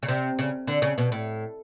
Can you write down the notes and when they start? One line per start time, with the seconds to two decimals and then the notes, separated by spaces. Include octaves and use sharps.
0.03 C#3
0.08 C3
0.39 C#3
0.67 D3
0.82 C#3
0.98 B2
1.12 A2